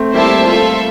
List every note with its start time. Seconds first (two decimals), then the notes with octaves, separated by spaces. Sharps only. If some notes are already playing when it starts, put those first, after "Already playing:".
Already playing: A3 C4
0.14 G3 A#3 E4 G4 C5 E5 A5
0.46 F4 A4 E5